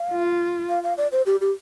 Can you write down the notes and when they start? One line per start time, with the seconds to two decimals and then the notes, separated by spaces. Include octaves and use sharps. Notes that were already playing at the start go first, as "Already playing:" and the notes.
Already playing: F5
0.12 F4
0.69 F5
0.83 F5
0.98 D5
1.12 C5
1.26 G4
1.41 G4